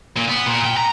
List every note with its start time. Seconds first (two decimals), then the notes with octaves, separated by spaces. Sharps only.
0.17 A#2
0.28 B3
0.46 A#2
0.64 G5
0.77 A#5